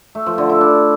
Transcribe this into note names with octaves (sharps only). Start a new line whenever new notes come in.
A3
F3
D3
E4
D4